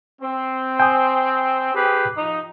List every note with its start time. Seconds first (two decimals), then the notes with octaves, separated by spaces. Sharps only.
0.21 C4
0.80 G5 G#5 D#6
1.74 G4 G#4 B4
2.16 F3 D#4